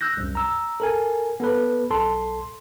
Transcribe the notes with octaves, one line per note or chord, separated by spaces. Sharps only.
E6 F#6 G6 A#6
C2 F#2
A#5 E6
A4 A#4 G#5
B3 A4 B4
B1 A4 A5 C6